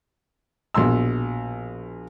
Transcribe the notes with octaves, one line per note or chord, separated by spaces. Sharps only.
A#1 B2 C6 E6